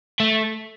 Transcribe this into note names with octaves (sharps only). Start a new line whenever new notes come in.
A3